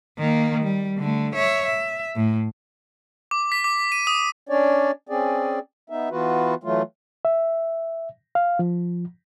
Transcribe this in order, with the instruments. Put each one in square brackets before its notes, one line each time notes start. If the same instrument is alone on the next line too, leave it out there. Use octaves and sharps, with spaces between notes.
[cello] D#3 A#3
G3
D3 A3
C#5 E5
E5
A2
[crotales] D6
B6
D6
D#7
D#6
[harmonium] C#4 D4 C#5 D5
C4 C#4 G#4 D5
B3 D#4 E5
E3 B3 F4 F#4 B4
E3 F#3 A3 F4
[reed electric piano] E5
F5
F3